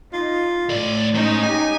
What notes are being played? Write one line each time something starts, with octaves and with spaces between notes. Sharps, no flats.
D#4 F4
C#2 A2 D5
G#3 C#4 D#4 C5
G#3 A#3 G4 G#5